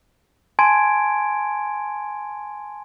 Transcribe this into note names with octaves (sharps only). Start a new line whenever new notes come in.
G#5 A5 C6 G#6 D7